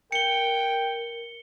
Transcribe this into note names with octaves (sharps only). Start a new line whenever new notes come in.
A#4 G5 C#7 G7